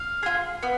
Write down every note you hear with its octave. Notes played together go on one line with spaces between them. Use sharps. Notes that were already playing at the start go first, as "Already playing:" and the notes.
Already playing: F5
F4 G#4
B3